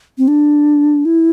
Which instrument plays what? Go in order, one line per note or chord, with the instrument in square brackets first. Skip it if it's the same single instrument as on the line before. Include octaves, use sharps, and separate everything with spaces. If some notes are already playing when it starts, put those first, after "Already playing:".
[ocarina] C4
D4
E4